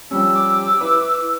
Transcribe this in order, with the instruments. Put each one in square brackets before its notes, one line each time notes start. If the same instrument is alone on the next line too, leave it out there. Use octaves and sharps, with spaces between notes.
[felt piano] F3 G3 C#4 [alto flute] G4 [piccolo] E6
[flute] D6
[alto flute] E4 [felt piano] B4